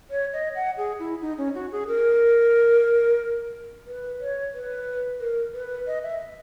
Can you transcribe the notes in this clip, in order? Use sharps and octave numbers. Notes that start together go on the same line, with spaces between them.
C#5
D#5
F#5
G#4
E4
D#4
C#4
F#4
G#4
A#4
B4
C#5
B4
A#4
B4
D#5
E5